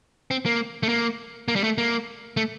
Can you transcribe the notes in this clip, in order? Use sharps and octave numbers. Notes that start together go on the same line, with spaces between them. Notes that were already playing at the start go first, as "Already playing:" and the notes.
C4
A#3
A3
A#3
A#3
G3
A3
A#3
A3